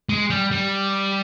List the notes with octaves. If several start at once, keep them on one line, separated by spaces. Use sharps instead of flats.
G#3
G3
G3